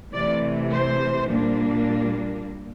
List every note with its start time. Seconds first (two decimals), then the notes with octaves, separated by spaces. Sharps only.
0.13 C3 E3 A3 D5
0.71 C5
1.29 A#2 G3 A#3 D4